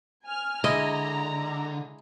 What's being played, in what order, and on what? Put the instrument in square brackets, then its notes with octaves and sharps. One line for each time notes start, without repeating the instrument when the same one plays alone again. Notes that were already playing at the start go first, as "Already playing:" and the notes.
[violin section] G#5 F6
[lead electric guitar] D3 [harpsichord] G#3 E4 [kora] D#5 [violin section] A#5